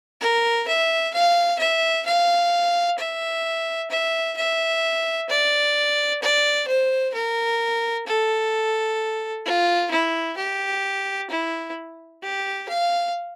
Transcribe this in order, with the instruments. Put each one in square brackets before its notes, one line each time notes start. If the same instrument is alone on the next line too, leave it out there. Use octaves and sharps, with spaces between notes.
[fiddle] A#4
E5
F5
E5
F5
E5
E5
E5
D5
D5
C5
A#4
A4
F4
E4
G4
E4
G4
F5